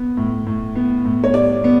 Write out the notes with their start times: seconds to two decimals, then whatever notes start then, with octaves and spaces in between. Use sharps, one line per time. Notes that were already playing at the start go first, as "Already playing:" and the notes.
Already playing: B3
0.17 A2
0.47 A2
0.76 B3
1.05 A2
1.24 C#5
1.34 G3 D5
1.64 B3